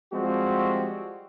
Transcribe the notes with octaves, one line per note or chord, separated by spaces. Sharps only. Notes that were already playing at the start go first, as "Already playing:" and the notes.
F3 G3 G#3 C4 F#4 G4